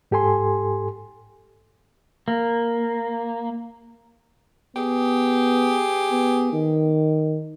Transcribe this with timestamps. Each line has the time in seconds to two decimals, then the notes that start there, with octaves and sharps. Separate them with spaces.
0.11 G#2 G4 A4 G#5 C6
2.28 A#3
4.77 B3 G4 G#4
6.11 B3
6.53 D#3